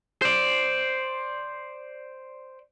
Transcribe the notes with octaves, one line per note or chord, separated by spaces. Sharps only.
C5 D5